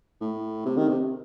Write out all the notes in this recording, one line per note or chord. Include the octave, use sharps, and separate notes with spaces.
A2
C3
D#3
C3